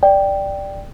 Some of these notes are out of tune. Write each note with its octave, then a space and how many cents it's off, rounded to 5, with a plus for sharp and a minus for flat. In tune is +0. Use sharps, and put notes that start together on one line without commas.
D5 +0 G5 +0